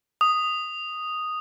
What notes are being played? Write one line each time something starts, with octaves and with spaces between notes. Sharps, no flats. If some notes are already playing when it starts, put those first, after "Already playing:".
D#6